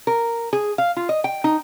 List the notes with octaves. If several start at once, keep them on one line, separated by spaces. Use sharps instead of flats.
A#4
G#4
F5
F4
D#5
G5
D#4